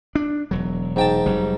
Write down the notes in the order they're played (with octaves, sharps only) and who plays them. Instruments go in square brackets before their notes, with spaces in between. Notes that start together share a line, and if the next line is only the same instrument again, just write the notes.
[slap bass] D4
E1 F#3
[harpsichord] G#2 G5 A5
[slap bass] F1 F#3 G3